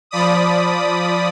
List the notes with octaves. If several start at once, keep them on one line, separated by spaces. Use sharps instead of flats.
F3 D5 B5 D#6